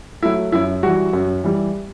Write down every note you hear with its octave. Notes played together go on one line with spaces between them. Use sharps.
F#3 A3 E4
F#2 E4
E3 G3 F#4
F#2
E3 G3